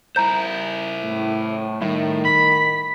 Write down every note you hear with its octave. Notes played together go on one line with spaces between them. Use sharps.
E4 C5 A#5 G6
A2
A2 D#3 G3 E5
B5 B6